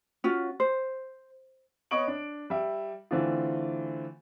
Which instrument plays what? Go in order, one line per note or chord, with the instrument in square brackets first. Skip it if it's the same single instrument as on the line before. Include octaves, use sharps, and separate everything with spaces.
[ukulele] C#4 F4 F#4
C5
[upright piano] B3 C#5 D#5 C#6 D7 F#7
D4
G3 E5
D3 E3 A3 C4 F4